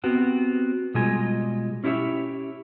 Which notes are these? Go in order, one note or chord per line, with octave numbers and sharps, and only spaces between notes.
B3 C4 F#4 G4
B2 G3 G#3 F4 G#5
C#4 E4 G4 C#5 E5